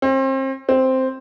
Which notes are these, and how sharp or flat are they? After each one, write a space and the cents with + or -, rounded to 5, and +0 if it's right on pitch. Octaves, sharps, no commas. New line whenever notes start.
C4 +35
C4 +0